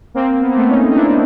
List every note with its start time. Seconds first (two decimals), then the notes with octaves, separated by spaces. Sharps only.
0.14 A#3 C4
0.42 B3
0.50 A#3
0.56 A3 B3
0.70 C#4 D#4
0.91 D#4
0.96 D4 E4